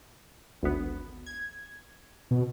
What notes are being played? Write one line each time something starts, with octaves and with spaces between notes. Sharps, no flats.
G#1 D2 B3
G#6
B2